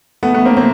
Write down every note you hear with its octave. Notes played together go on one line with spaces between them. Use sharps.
A3 B3
A3 B3
A#3 C4
A#3 C4